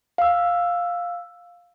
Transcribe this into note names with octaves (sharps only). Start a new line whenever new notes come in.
F5 E6